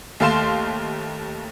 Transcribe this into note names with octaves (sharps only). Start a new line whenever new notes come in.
D#2 A3 F5 C6 E7